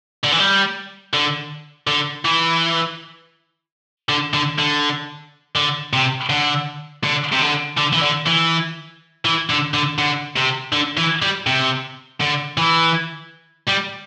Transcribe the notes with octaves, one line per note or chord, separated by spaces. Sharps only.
D3
E3
G3
D3
D3
E3
D3
D3
D3
D3
C3
D3
D3
C3
D3
D3
E3
D3
E3
E3
D3
D3
D3
C3
D3
E3
G3
C3
D3
E3
G3